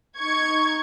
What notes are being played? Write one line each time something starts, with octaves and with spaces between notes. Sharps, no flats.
D#4 C#6 G#6